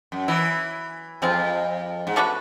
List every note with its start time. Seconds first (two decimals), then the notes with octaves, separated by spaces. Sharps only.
0.12 F#2
0.28 E3 F#3 B3 E4
1.22 F2 G#3 C4 F4
2.07 G#2
2.16 A3 D4 F#4 B4